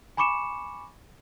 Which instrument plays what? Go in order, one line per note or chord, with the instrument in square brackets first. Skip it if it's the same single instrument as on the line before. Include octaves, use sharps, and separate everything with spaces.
[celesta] G#5 B5 C#6 D6 C#7 E7